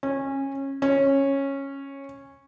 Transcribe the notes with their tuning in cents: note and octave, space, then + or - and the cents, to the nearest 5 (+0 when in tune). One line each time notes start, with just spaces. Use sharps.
C#4 -20
C#4 -10